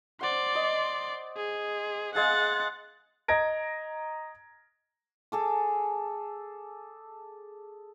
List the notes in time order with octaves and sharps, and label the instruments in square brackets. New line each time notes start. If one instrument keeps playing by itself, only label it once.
[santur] C5 F#5 [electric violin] D5 C6
[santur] D#5
[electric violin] G#4
[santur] G#3 G#4 F5 [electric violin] F#5 A6
[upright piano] D#5 A#5 G#6 A#6 D7
[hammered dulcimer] G#4 A4 D6